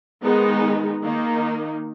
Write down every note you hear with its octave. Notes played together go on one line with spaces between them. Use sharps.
D#3 G#3 B3 D#4
D#3 A#3 D#4